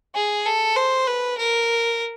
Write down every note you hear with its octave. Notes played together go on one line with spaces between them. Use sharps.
G#4
A4
C5
B4
A#4